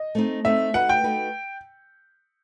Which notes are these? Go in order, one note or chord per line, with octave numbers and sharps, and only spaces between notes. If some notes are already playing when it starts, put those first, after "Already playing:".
Already playing: D#5
A3 C4 D#4
A3 C4 D#4 E5
A3 D#4 F#4 B4 F#5
G5
A3 D#4 F#4 B4